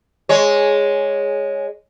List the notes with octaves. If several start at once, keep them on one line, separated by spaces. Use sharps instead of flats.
G#3 C#5